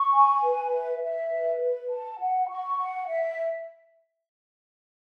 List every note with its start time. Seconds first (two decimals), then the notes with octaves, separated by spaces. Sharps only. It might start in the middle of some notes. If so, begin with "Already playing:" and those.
Already playing: C#6
0.12 G#5
0.42 B4
0.72 E5
1.01 E5
1.31 B4
1.60 B4
1.88 A5
2.18 F#5
2.48 C#6
2.78 F#5
3.07 E5